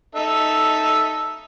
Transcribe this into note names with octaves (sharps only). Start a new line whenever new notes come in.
D#4 A4 E5